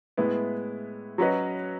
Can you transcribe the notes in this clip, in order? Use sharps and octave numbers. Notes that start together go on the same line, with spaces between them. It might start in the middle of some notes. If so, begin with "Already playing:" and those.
A2 G#3 B3 E4 B4
F#3 C#4 F#4 B4 D#5